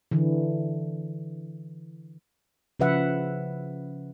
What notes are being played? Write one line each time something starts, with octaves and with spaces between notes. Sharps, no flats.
D3 E3
C#3 F3 B4 E5 F#5